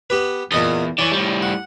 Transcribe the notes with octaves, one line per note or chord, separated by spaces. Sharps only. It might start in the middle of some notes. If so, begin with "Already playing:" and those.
B3 G4 B4
E2 A#2 D#5 D#6
E3 C#5 D5
A2 G3
F#5